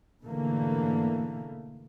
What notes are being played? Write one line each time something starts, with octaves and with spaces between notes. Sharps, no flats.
G#2 B2 D3 E3 A3 A#3